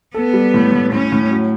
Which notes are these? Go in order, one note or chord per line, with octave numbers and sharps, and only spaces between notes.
B3 A4
G3
A2
A2
A2 C#4
A2
F#3